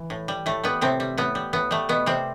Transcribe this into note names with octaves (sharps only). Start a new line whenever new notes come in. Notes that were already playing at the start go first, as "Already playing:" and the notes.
Already playing: E3
A2
G3
A2 A3
G3 B3
A2 C3 C4
G3
A2 B3
G3
A2 B3
G3 A3
B2 B3
C3 G3 C4